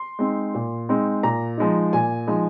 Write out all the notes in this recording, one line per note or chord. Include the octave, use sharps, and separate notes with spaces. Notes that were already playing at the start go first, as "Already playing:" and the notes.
Already playing: C6
G#3 C4 D#4
A#2
G#3 C4 D#4
A#2 A#5
F3 G#3 D#4
A#2 G#5
F3 G#3 D#4